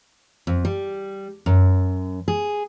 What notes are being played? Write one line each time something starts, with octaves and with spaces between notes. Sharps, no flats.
F2
G3
F#2
G#4